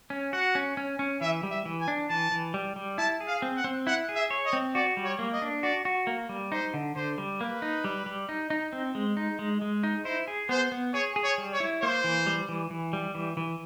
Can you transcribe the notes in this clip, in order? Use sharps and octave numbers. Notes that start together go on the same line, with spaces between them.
C#4
F#4 F#5
C#4
C#4
C#4
E3 E5
G3
E5
E3
G#5
D4
E3 A5
E3
G3
G3
E4 A5
G#4
F5
C4
F#5
C4
E4 F#5
G#4
E5
C#5
D#5
C4
F#4 D5
G3
C#5
A#3
D#5
D4
F#4 D5
F#4
A#3
G3
D#4 C5
D3
D3 C5
G3
A#3 B4
D#4
G3
G3
D#4
D#4
C4
G#3
D#4
G#3
G#3
D#4
E4 C5
G#4
B3 C5
B3
G#4 C#5
G#4
C#5
G3
C#5
E4
A#3 C5
E3
G3
E3
E3
G3
E3
E3